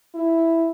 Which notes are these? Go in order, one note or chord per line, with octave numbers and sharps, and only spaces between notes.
E4